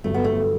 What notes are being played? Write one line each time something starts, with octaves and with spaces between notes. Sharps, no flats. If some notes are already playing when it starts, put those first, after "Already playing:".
G1 G2 F#3 A3
B3
A3